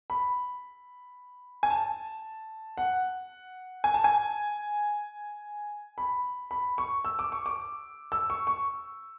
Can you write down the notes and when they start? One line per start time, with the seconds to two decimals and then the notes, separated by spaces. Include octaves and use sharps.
0.10 B5
1.63 G#5
1.70 A5
2.78 F#5
3.84 G#5
3.94 A5
4.04 G#5
5.98 B5
6.51 B5
6.78 C#6
7.05 E6
7.19 D6
7.32 C#6
7.46 D6
8.12 E6
8.30 C#6
8.47 C#6